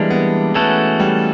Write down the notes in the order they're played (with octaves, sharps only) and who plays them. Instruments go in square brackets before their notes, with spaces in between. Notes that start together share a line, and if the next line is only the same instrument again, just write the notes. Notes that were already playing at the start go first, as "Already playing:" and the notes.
Already playing: [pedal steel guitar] E3 G3 A#3 D4 [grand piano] G#3
[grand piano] B3
[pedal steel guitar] E3 A3 C#4 F#4 A4 [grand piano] B3
[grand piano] G3